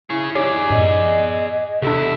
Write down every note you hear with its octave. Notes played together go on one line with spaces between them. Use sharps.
E4 G#4 C#5
D#4 G4 G#4 C#5 D5
F#2 A2 D#5
E2 C3 D4 E4 A4